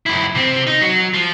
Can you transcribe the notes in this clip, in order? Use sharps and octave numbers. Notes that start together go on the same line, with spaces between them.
F#2 E4
C3 C4
D#4
F#3
F3